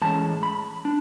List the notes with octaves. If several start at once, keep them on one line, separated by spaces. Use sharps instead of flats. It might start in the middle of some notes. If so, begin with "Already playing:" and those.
A2 E3 G#3 C#4 A5
B5
D4